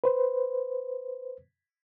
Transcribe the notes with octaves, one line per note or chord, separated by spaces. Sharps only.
B4 C5